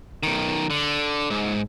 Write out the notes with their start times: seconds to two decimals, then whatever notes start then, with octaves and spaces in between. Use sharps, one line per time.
0.23 B1 D#3
0.70 D3
1.30 G#2